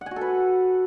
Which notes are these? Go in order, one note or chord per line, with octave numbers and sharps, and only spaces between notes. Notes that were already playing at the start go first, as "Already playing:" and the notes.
F#5
G#5
F#4
A4
B4